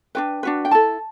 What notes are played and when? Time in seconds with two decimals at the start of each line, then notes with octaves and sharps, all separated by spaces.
0.15 D4 F#4 B4 G5
0.43 D4 F#4 B4
0.65 G5
0.71 E4 A4 A5